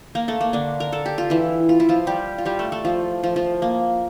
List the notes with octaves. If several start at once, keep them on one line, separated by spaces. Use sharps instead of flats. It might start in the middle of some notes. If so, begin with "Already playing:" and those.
A#3 A#4
A3 A4
A#3
D3 D4
A#4
A4
G4
F4
E3 E4
F4
E4
F3 F4
G3 G4
F4
G3 G4
A3 A4
A3 A4
F3 F4
F3 F4
F3 F4
A#3